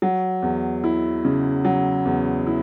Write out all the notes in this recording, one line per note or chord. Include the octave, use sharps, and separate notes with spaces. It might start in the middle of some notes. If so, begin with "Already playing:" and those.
F#3
E2
E4
C#3
F#3
E2
E4